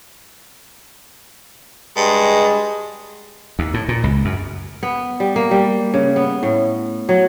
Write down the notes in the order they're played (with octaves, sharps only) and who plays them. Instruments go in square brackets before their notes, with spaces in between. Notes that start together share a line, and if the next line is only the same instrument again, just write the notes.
[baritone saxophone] G2 [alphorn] G#3
[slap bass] D#2
A2
A#2
C#2
F#2
[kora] B3
G3
A#3
G3
C#3
B3
A2
F#3